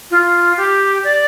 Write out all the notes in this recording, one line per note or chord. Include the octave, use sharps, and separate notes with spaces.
F4
G4
D5